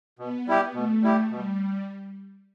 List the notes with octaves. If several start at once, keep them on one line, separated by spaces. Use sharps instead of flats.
B2 B3
G3 E4 G4
B2 A3
G3 E4 G4
B2 G3